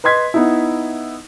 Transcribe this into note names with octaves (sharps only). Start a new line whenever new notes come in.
B4 D#5 C6 G#6 B6
B3 D#4 E4